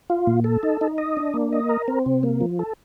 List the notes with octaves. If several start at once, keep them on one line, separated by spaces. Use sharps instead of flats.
F4
A#2
A4
D#4
D#4
D#5
D4
A#3
D#5
A#4
C4
C3
A#3
F3
A4